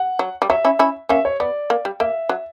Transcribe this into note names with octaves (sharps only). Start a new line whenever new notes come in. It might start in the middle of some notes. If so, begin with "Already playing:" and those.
Already playing: F#5
F#3
G3
F#3 E5
C#4 E4
C#4 E4
A#3 C#4 E5
C#5
B3 D5
A#3
G3
A#3 E5
F#3